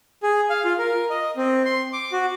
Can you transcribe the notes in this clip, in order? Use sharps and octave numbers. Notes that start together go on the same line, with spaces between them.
G#4
F5
F4
A#4
D#5
C4
C6
D6
F#4